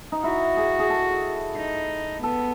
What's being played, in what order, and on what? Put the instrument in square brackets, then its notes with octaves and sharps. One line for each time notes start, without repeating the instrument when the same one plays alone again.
[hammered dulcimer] D#4
[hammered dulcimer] E4 [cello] F#4
[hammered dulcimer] G#4
G#4
A4
[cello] D#4
[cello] B3 [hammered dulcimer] A4